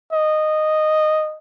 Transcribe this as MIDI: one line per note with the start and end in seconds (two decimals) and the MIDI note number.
0.13 1.38 75